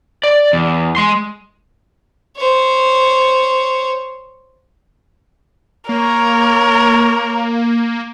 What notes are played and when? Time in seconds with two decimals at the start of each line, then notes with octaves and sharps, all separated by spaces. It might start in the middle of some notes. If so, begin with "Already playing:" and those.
0.24 D5
0.53 E2
0.97 G#3 C6
2.37 C5 C#5
5.89 A#3 A#4 C#5